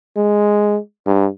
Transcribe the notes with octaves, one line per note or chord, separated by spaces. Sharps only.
G#3
G2